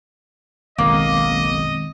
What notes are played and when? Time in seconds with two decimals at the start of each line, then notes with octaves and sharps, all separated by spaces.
0.78 F#1 B1 D#3 G#3 A#3 C4 D#5